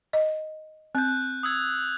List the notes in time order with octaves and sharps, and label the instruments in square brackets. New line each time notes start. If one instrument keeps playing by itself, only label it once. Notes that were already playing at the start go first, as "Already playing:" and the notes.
[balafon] D#5
[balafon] C4 [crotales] F#6 G6
[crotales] D#6 E6 G#6